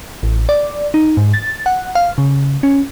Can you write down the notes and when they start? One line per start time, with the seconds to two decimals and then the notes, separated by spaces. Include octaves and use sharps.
0.23 A1
0.49 D5
0.94 D#4
1.17 G#2
1.33 A6
1.66 F#5
1.95 F5
2.18 C#3
2.63 C#4